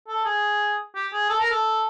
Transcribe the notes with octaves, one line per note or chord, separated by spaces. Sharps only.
A4
G#4
G4
G#4
A4
A#4
A4